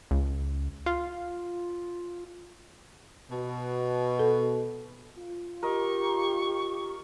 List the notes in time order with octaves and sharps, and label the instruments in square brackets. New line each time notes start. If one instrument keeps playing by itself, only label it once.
[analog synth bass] C#2
F4
[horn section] B2
[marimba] A4
[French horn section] F4
[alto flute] G4 [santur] A#4 D#5 [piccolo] C#6